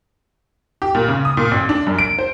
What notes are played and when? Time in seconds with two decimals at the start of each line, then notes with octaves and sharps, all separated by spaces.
0.82 G4
0.95 A#2
1.08 C#3
1.25 D#6
1.37 A#2
1.51 A1
1.69 D4
1.87 F#2
1.99 D7
2.19 C5